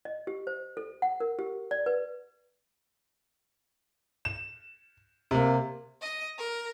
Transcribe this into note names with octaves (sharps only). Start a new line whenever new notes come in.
D#5
G4
C5
A4
F#5
A#4
G4
D5
B4
E7
C3 A#3
D#5
A#4